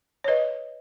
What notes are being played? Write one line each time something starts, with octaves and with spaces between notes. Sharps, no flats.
C#5
B4 D#5